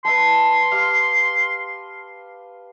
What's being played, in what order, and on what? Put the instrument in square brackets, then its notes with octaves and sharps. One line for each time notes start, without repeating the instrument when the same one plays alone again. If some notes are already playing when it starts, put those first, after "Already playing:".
[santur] B4 E5 A5 [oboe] C6
[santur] G4 F5